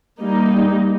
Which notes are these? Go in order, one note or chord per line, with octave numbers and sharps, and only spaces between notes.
G3 A#3 D#4